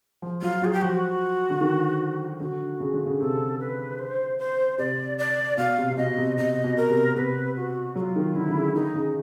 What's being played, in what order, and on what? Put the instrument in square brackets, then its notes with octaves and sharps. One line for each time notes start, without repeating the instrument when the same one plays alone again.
[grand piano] F3
[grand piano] F#3 [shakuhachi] F4
[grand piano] F#3 [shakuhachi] G#4
[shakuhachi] G4
[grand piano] F3 [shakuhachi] F#4
[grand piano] D3
D#3
[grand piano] D3 [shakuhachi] F#4
[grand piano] C#3
D3
C#3
[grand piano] C3 [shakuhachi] A4
[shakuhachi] B4
C5
C5
[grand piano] C3 [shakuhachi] D5
[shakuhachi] D5
[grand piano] B2 [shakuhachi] F5
[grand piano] C3
C3
[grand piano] B2 [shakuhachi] D#5
[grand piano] C3
[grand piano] C3 [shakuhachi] D#5
[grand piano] B2
[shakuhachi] A#4
[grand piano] C3
[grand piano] C3 [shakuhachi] B4
[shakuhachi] F#4
[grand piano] F#3 [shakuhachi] F#4
[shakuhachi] F4
[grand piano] D#3
[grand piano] D3 [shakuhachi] E4
[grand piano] D3
C#3
[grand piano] D#3 [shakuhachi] D#4
[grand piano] C#3